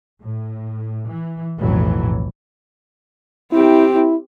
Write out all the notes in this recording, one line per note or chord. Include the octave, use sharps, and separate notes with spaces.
A2
E3
B1 F2 A2 E3 F#3
C4 E4 G4
E4